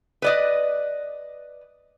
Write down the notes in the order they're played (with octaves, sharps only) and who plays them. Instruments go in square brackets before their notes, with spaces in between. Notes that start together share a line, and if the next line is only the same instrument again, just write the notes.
[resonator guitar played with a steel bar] B4 D5 D#5